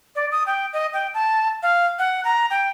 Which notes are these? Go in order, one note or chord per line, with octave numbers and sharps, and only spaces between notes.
D5
D#6
G5
D#5
G5
A5
F5
F#5
A#5
G5